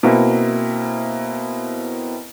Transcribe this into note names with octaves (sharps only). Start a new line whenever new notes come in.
B2 A#3 C4 E4